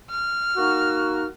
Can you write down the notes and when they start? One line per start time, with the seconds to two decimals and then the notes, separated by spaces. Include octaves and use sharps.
0.10 F6
0.57 A#3 D#4 F#4